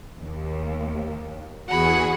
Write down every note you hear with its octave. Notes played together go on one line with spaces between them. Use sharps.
D#2
E2 F#4 G#4 F#5 B5